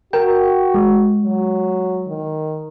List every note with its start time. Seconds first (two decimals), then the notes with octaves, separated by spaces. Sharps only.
0.13 F#4 A#4 G5
0.74 G#3
1.23 F#3
2.08 D#3